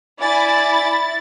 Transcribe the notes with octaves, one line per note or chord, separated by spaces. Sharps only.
E4 D5 G#5 A6